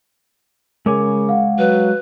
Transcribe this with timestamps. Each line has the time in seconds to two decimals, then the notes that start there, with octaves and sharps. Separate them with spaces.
0.86 C#3 G#3 A#4 C#5 G#5 D6
1.29 F5 F#5
1.59 F#3 B4